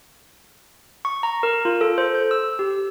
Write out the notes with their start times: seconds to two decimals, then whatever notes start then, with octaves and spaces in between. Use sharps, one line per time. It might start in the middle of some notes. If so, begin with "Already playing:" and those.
1.05 C#6
1.23 A#5
1.43 A#4
1.65 F4
1.81 A4
1.98 C5
2.15 G6
2.31 E6
2.59 G4